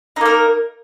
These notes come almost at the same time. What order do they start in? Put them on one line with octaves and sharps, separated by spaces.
D#4 A#3 A#4